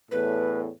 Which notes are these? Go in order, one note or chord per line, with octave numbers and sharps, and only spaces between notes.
E2 A2 B4